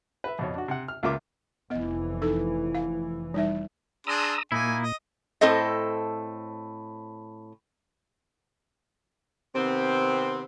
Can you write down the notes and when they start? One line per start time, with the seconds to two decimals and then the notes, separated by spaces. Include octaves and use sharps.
0.24 B4 E5
0.39 F2 B2 C#5
0.55 D4 F#4
0.68 C3 F#5
0.88 F6
1.03 C#2 A#3 F4 E5 D6
1.70 F1 E3 B3 D#5
2.22 D#4 A4
2.75 F5
3.34 G3 D#4 E5
4.07 D4 G#4 A#5 C6 D#6 E6
4.52 A#2 A#3 D#4 E4 G#5
4.82 D#5
5.41 A2 C4 A4 C5 D#5
9.55 C3 D#3 B3 C4